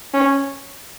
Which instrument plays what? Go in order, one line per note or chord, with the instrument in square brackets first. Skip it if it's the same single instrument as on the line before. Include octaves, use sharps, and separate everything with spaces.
[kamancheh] C#4